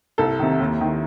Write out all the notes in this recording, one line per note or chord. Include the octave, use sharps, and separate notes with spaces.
C2 A4
C3 D#3
D#2
D#3